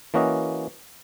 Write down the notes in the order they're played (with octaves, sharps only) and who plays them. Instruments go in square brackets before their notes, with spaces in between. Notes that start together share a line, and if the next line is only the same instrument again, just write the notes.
[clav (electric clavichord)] E3 A#3 C#4 F#4 D#5